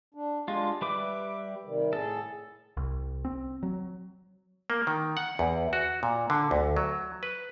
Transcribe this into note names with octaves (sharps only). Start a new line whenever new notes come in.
D4
G#3 D4 F4 G4
G3 B4 E5 D6
C3 D#3 G3
A2 G#4 A4
C2
C4
F#3
A#3
D#3
F#5
E2
F#4
A#2
D3
D2
F#3
B4